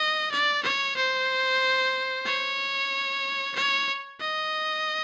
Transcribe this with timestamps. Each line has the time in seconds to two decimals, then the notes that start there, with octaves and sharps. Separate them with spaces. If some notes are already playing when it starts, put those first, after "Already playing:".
Already playing: D#5
0.31 D5
0.63 C#5
0.97 C5
2.26 C#5
3.55 C#5
4.21 D#5